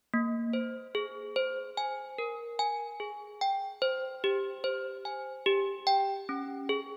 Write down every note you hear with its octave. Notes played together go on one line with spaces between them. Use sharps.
A#3
C5
G#4
C5
G#5
A#4
G#5
G#4
G5
C5
G4
C5
G#5
G4
G5
C#4
G#4